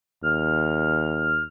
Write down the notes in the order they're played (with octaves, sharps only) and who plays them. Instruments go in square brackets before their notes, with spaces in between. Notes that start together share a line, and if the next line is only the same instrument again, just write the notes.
[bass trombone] D#2 [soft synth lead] F6